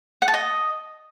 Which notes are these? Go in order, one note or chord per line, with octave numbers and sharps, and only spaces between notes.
F#5
A5
D#5